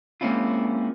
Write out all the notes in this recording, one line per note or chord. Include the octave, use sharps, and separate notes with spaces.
G#3 A#3 C4 C#4 E4 F4